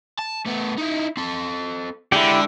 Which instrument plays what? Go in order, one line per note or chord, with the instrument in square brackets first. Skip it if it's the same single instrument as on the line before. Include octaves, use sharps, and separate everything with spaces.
[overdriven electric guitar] A5
A3 B3
D#4 E4
C4 A4
[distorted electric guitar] D3 [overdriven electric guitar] G#3 [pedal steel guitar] E4 G4